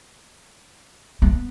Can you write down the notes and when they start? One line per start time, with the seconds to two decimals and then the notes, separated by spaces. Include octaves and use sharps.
1.22 B3